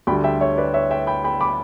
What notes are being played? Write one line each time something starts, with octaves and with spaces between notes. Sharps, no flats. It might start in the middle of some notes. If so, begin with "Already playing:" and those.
D2 D3 G3 G5 B5
E5 G5
C#5 E5
B4 D5
C#5 E5
E5 G5
G5 B5
G5 B5
B5 D6